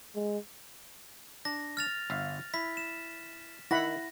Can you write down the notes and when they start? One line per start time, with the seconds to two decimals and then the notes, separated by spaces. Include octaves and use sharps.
0.15 G#3
1.45 D4 A#6
1.77 F6 A6 F7
2.10 G1 E5 F5
2.54 E4 B6
2.77 E7
3.71 D#3 E4 F#5 B5 A#6